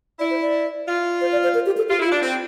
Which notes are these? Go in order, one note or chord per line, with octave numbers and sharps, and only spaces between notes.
E4 D5
C5
D5
F4
C5
D5
C5
A#4
G4
A4
F4 G4
E4
F4
D4
C4